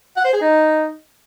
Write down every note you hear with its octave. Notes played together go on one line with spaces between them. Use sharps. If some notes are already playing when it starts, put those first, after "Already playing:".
F#5
C5
G#4
D#4